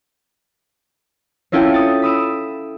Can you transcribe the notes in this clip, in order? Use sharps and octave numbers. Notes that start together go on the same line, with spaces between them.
C4 C#4 E4 F4 A4 G5
D#6 A6 C#7
B5 D#6 E6 D7